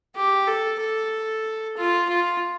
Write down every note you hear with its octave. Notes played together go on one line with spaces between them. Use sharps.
G4
A4
A4
F4
F4